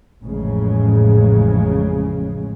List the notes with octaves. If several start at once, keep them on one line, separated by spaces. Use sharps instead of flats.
A1 F2 C#3 G#3